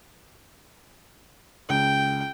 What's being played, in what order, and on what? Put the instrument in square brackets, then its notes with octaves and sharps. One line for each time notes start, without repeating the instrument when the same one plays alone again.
[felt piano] C#2 [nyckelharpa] G5